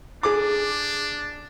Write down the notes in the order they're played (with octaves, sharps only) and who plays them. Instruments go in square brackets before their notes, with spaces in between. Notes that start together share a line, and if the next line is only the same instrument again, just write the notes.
[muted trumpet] D4 [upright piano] G#4 D6